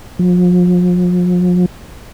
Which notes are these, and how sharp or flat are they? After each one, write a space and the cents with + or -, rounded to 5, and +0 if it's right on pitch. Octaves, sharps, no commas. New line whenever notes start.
F3 +40